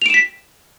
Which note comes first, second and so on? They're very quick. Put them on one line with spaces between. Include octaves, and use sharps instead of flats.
F7 D7 E7 B6